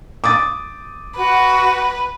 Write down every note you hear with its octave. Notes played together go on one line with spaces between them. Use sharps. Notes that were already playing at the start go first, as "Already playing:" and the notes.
D6 D#6 A6
F#4 B4